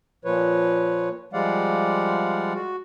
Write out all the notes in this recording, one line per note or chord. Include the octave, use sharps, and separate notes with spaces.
A#2 F3 B4 C#5
F3 G3 G#3 D5 F5 F#5
F#4